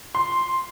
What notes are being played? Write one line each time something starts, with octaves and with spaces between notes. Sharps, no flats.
C6